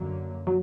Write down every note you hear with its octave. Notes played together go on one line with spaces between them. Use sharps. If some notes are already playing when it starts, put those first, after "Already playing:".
Already playing: F#2 D3 F#3 A#3
F#3